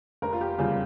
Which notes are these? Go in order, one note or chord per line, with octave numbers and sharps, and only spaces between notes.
F1 A#4
F4
G4
E2 C#3 G3 F4